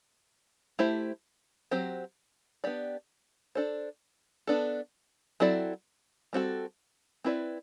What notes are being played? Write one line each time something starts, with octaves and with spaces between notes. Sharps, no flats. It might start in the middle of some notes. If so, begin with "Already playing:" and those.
A3 E4 G4 C5
F#3 C4 G4 C5
B3 D4 G4 D5
D4 A4 C5
B3 D4 A4
F#3 C4 E4 A4 D5
G3 C4 F#4 A4
C4 E4 B4 D5